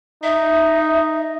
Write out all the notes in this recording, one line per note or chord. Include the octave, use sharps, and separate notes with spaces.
D#4 E5